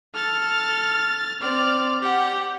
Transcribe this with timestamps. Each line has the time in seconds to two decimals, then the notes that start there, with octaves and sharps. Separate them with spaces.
0.15 A4 F6 A6
1.41 C4 D5 F6
2.02 G4 F#5